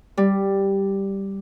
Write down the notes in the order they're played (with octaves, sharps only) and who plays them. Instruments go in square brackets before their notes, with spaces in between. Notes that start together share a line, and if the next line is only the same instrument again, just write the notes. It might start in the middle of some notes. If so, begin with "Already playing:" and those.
[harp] G3